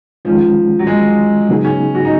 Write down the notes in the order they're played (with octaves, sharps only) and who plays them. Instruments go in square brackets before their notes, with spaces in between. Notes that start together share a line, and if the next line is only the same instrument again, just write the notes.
[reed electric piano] D#3 G#3 C#4 [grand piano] F3
[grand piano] F#3
G#3
[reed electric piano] C#3 F#3 B3 D#4 G#4
[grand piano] C#4
F#4
D#4